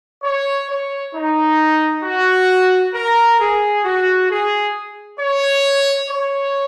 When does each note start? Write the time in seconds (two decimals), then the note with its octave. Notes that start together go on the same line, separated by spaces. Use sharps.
0.23 C#5
0.68 C#5
1.13 D#4
2.03 F#4
2.94 A#4
3.39 G#4
3.84 F#4
4.29 G#4
5.19 C#5
6.10 C#5